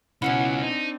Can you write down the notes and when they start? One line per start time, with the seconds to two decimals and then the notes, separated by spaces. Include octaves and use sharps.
0.22 C#2 B2 F#3 C#4 E4 F#5 G#5
0.62 C4 D4 D#4